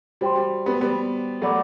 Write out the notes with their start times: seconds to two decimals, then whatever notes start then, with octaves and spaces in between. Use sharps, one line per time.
0.21 G3 F#4 C5 G5 C6
0.36 G3
0.66 G3 B3
0.81 G3 B3
1.42 F#3 A3 A4 D5 F#5 B5 D6